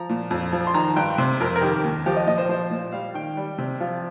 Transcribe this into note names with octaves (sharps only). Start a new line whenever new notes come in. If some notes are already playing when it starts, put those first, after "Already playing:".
Already playing: F3 A#5
A#2
F2
F3
C6
D#3 A#5
G2 G5
C3 C6
F2 A#4
A#4
D#3 G4
D#2
F3 G4
D#5
A#2 D#5
C5
F3 C5
A#2
G3 F5
D#3 G5
G3
C3
F3 F4